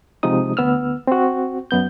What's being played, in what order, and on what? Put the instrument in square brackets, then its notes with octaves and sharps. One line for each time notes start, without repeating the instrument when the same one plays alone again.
[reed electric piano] C3 F3 G#3 D#4 D#6
D2 B3 E6 F6
C4 F#4
F#2 B3 G6